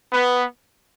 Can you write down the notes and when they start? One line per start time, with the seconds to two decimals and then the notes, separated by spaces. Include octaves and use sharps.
0.12 B3